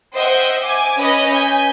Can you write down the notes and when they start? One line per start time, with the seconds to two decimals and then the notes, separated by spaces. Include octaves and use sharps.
0.15 C5 D#5 E5 F#5 G5
0.62 G#5 D6
0.98 C#4 B4 D#5
1.31 G#5 G6 B6